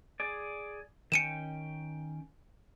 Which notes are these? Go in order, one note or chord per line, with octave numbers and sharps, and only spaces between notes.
G#4 D5
D#3 C#4 G5 C#7 D#7 E7